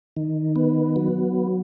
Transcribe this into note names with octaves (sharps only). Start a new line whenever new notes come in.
D#3
B3
F#3